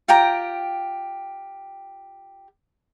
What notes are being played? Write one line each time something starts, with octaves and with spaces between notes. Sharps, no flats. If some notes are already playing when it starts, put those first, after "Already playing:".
F4 G4 G5 A#5